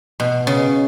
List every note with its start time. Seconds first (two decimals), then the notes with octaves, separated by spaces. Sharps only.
0.20 B2
0.47 C#3